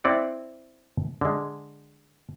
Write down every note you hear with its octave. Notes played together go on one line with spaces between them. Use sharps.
C4 E4 D5 F5 F#5
D3 G#3